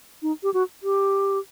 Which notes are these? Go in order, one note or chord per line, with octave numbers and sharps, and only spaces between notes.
D#4
G4
F#4
G4